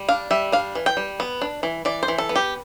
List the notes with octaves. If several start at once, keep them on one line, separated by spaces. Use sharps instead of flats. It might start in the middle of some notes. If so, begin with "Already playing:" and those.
Already playing: G3
D4 F5
G3 E5
D4 F5
E3
G5
G3
B3
D4
E3
E3 D5
C5
E3
A4
B3
G4